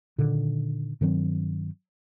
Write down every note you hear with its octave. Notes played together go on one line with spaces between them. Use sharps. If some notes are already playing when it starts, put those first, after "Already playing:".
A#2 D3 D#3
G2 D#3 F#3 C4